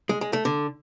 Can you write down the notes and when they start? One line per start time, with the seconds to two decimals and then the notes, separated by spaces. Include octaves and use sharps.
0.09 G#3
0.21 G#3
0.33 A3
0.45 D3